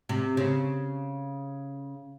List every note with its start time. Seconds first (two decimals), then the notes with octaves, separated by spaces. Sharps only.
0.09 C3
0.37 C#3